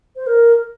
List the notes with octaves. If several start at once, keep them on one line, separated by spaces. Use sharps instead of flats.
C5
A#4